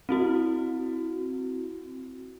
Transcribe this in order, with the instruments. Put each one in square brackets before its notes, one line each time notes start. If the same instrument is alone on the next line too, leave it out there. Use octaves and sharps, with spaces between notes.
[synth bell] C4 E4 F#4